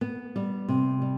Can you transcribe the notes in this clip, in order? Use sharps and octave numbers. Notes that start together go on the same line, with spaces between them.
B3
G3
C3
G3